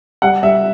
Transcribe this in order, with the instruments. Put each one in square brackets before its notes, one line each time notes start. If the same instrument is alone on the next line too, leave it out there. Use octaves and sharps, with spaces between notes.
[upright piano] G3 F#5
G3 E5